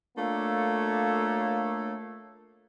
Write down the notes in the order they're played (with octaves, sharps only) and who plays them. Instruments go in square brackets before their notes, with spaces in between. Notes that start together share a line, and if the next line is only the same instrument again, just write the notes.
[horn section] A3 A#3 D4 F4 A4 C#5